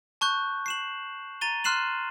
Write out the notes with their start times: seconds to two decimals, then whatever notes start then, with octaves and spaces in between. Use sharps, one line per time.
0.21 A5 C#6 F#6 G6
0.66 C7 E7 F#7
1.41 A#5 A6 D#7 G7
1.64 C6 F6 F#6 C7 E7 F#7